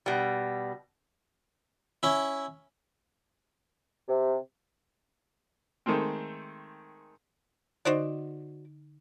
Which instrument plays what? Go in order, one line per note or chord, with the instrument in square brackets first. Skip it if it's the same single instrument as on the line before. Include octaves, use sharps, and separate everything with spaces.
[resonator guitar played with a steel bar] B2 G3
[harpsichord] C#4 E4
[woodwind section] C3
[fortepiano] D#3 G#3 A3 C4
[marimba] D3 D#4 D#5 [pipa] F#4 C5 D5